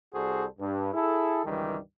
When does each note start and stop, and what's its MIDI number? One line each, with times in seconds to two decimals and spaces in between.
0.14 0.45 36
0.14 0.45 55
0.14 0.45 66
0.14 0.45 68
0.14 0.45 69
0.14 0.45 72
0.59 0.90 43
0.93 1.44 64
0.93 1.44 68
0.93 1.44 69
1.45 1.77 37
1.45 1.77 43
1.45 1.77 51
1.45 1.77 52
1.45 1.77 55